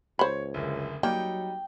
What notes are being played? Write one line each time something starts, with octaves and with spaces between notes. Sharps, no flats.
C#2 C5 C#5 B5
F#1 D2
F#3 G3 A#3 D#4 G5